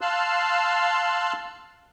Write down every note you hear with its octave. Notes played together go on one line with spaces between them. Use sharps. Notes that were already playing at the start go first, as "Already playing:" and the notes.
F5 A5 C6 E6 F#6